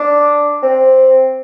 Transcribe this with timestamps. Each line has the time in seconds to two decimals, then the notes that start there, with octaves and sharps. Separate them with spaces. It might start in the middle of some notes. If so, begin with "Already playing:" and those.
Already playing: D4
0.63 C4